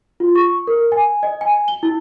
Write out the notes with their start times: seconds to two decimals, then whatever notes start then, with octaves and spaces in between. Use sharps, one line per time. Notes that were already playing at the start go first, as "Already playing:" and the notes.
0.20 F4
0.35 C#6
0.67 A#4
0.92 G#5
1.23 D#5
1.41 G#5
1.68 G7
1.83 E4